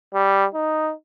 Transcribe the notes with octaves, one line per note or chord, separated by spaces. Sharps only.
G3
D#4